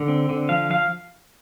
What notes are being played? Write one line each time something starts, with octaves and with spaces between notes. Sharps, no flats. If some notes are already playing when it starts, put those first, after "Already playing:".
Already playing: D3
C4
D3
F3 F5
F3 F5